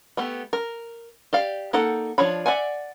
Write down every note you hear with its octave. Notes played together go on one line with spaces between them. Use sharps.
A3 B3 G4
A#4
G4 D5 F5
A#3 D#4 A4 F#5
F3 D4 C#5 B5
D5 E5 F#5 G#5